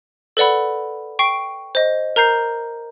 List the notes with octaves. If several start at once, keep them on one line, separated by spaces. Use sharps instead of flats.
A4 B4 D5 F#5 B5
G5 C#6 C7 D7
C5 D#5
A#4 A#5 G6 C7